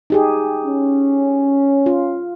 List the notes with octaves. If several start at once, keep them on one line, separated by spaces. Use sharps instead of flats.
D#4 G4 G#4
C#4
F4